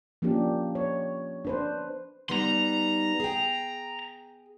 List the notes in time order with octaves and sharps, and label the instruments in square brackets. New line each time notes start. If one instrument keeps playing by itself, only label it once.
[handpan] F3 A#3 C#4 D4 G4
C#5
D4 B4 C5
[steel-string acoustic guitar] G3 B3 D#4 [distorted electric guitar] A#5 C6
[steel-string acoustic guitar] G#4 G5